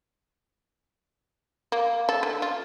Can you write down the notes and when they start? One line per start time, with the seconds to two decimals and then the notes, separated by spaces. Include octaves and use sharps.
1.72 A#3
2.09 A4
2.23 D3
2.42 F4